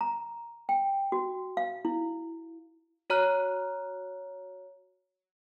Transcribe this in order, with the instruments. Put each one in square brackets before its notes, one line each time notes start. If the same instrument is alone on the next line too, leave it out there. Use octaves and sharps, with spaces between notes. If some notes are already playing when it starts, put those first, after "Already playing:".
[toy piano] A#5
G5
F#4
F5
E4
[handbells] F#4 C#5 A#5 F6 F#6